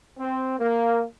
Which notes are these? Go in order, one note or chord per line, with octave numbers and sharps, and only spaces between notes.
C4
A#3